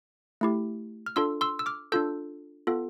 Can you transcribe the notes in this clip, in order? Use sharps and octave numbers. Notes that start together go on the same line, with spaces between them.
A3 E4 G4
F6
D4 F4 A4 C6 E6
C6 E6
E6
D6 F6
D4 F4 A4 E6 G6
B3 F4 A4